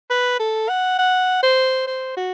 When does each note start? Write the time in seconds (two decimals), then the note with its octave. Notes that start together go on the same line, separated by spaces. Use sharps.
0.10 B4
0.39 A4
0.69 F#5
0.99 F#5
1.43 C5
1.87 C5
2.17 F#4